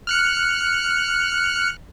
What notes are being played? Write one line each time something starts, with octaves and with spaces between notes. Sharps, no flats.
F6 F#6 C#7